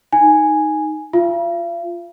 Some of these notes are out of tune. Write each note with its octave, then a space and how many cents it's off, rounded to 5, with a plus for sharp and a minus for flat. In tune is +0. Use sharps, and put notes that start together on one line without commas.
D#4 +0 G#5 -5
F4 +0 F5 -45